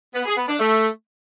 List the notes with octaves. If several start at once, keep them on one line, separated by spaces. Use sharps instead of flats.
B3
G#4
B3
D4
A3